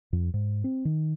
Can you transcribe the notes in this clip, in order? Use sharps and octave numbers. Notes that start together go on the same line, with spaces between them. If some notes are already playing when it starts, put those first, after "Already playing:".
F2
G#2
C4
D#3